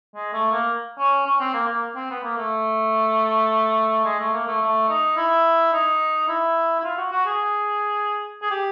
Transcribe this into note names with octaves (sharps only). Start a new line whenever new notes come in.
G#3
A3
A#3
C#4
C#4
C4
A#3
A#3
C4
B3
A#3
A3
G#3
A3
A#3
A3
A3
D#4
E4
D#4
E4
E4
F4
F#4
F#4
G#4
G#4
G4